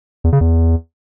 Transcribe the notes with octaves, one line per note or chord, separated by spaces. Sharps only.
E2
C#3
E2